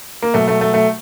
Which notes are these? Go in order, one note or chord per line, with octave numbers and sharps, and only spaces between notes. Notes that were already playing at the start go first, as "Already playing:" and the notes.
A#3
B2 F#3 A3
A3
A3
A3